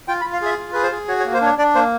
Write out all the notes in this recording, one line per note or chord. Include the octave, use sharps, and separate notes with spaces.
F4 G5
B5
F4
F5
G#4 E5
F4
G#4 B4
C5
G#4
F#4 C#5
C#5
A#3
C5
D4 C#5
D4 D5
A#3 C5